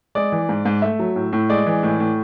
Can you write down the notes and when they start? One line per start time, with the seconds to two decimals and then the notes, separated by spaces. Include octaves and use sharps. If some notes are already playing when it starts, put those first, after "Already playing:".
0.15 G#3 D5
0.32 E3
0.49 G#2
0.65 G#2
0.82 A3 E5
0.99 F#3
1.16 A2
1.33 A2
1.50 G#3 D5
1.66 E3
1.83 A2
2.00 A2